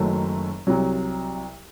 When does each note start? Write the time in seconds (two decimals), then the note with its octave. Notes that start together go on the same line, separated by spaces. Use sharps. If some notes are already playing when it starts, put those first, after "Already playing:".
Already playing: F#1 F#2 D#3 F#3 A3
0.67 C2 C3 F#3